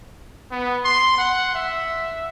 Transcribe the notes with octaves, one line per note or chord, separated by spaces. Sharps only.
B3
C6
F#5
E5